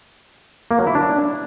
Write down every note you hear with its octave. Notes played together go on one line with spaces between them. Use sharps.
A#3
F#3
E4
D4